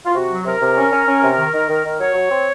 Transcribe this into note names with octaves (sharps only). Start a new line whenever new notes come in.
F4
C3 F#4
F#3
C3 A#4
C3
C#4
C#4
C#4
C3
D#3
D#3
D#3
D#3
F#3 C#5
F#3
C4